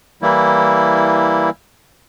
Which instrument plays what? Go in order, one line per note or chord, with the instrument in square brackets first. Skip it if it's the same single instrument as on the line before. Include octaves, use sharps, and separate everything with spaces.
[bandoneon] E3 G3 A#3 E4